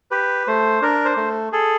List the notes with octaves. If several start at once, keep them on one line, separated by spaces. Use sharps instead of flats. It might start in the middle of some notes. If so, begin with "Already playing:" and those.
G4 B4
A3 C5
D4 A#4
C5
A3
G#4 A4